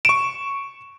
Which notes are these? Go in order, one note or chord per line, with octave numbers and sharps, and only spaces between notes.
C#6 D7 E7